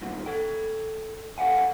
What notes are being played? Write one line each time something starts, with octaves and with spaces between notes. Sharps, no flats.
E2 G2 A#2 D#3
A4 G5
A4 D5 F5 F#5 G#5